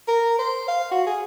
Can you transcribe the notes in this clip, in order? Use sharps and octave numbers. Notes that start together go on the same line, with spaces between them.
A#4
C5
F5
F#4
G#4